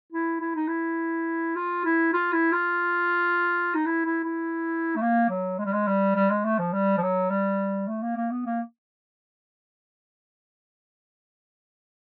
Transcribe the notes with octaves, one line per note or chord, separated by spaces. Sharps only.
E4
E4
D#4
E4
F4
E4
F4
E4
F4
D#4
E4
E4
E4
A3
A#3
F#3
G#3
G3
G#3
G3
G3
G#3
A3
F3
G3
F3
F#3
G3
A3
A#3
A#3
B3
A#3